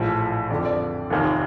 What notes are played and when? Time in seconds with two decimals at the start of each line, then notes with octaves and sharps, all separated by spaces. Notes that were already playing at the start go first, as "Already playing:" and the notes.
Already playing: A#1 A2 F3
0.50 F2 D3 F3 D5
0.65 D5
1.10 F1 D#2 D#3